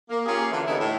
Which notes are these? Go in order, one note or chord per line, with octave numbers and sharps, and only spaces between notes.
A#3
A#3 C#4 F4 G4 G#4
D3 E3
D3 G3 B3 C#4 D#4 E4
A2